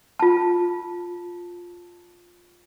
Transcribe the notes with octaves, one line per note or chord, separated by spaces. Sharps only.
F4 A5